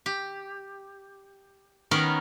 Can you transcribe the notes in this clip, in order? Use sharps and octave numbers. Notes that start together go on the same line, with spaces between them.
G4
D#3 B3 C#4 A#4